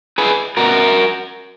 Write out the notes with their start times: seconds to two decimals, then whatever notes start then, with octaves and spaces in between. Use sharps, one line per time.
0.18 G#4 B4
0.57 B2 F#4 A#4